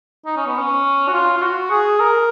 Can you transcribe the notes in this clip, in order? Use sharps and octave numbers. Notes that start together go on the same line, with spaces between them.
D#4
C#4
B3
C#4
F#4
F4
F4
F#4
G#4
A#4